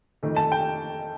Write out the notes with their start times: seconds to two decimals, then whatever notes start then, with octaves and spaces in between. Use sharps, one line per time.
0.23 F2 D#3 A3
0.36 A5
0.52 G5